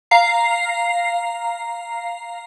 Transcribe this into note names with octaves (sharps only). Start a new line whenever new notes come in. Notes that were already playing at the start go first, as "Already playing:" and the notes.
F5 A#5 C7